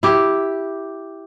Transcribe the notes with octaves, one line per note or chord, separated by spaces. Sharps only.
E4 G4